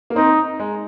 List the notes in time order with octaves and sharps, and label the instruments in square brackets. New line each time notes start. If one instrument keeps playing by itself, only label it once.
[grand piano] A#3
[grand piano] C4 [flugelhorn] D#4
[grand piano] G#3